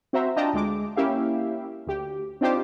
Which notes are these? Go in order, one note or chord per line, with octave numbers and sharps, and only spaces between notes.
C4 F#4 C5 E5 A#5
D4 F4 D#5 G5 A5 A#5
D2 G#3 D6
A#3 C#4 E4 G4 E5 F5
D2 G4
C4 D4 D#4 F4 G4 C5